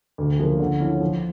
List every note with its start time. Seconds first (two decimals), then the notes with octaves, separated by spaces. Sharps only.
0.18 D2
0.40 C#3 F3 A#3
0.59 D3
0.80 F3 C#4 E4
1.01 F3